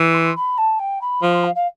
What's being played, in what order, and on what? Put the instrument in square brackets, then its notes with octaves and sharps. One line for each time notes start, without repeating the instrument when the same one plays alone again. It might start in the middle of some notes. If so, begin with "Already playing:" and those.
Already playing: [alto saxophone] E3
[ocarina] C6
B5
A5
G5
B5
[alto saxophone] F3 [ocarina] C6
[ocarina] C6
F5
F5